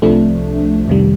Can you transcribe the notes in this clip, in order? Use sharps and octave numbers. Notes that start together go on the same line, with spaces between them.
C2 C3 F3 A3 D4
F2 C3 D#3 G3